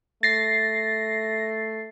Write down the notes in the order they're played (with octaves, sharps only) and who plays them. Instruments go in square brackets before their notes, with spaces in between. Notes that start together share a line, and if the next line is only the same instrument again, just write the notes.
[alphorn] A3 [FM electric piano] A6 C7 [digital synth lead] A#6